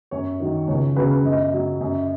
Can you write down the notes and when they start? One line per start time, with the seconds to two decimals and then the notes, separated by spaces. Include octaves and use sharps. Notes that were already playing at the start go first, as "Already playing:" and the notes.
0.11 F#2 C#5
0.40 D#3 F#3
0.68 C#2 C#5
0.96 C#3 F#3 B4
1.25 F#2 D#5
1.54 F#3
1.81 F#2